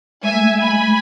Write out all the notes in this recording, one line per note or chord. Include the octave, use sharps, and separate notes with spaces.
G#3 E5 G#5
A3
A3
G#3
A3 G#5 B5
G#3
A3